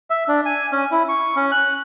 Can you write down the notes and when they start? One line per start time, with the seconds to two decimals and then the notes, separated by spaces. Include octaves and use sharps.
0.10 E5
0.28 D4
0.46 G#5
0.72 C#4
0.92 E4
1.09 C#6
1.37 C#4
1.52 F#6